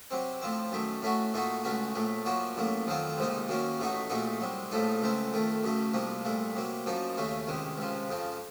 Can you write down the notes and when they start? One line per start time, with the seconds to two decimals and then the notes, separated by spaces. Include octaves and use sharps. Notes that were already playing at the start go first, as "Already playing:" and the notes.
0.11 C3 F#3 C4
0.41 A2 F3 C4
0.72 F#2 D#3 A3
1.02 A2 A3 C#4 F#4
1.34 A#2 A3 D#4 F#4
1.64 C#2 C#3 A3 C#4 F#4
1.95 A#1 A2 A3
2.25 F#2 F3 A#3 C#4 F#4
2.56 A1 A2 F#3 A#3
2.87 F2 D#3 F#3 C4 F4
3.18 C#2 C3 F3 A#3 D#4
3.48 F#2 D#3 F#3 A#3 C#4
3.80 A1 A2 A3 D#4 F#4
4.09 A#1 A#2 A3 D#4 F#4
4.41 C2 C3 F#3
4.72 A#1 A2 F3 A3 D#4
5.02 C#2 C#3 A3 C4
5.33 F2 D#3 A3
5.63 F#2 C#3 A3
5.94 C2 C3 F3 A#3
6.25 C2 A#2 A3
6.55 C3 F#3 A#3
6.86 F#2 F3 A#3 D#4
7.17 D#2 C#3 A3 C#4
7.47 C#2 C3 D#3
7.78 C#2 C3 F3
8.09 F2 C#3 F3